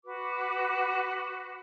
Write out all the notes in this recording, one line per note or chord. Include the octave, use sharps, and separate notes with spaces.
F#4 B4 D6